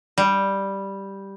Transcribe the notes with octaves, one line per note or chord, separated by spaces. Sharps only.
G3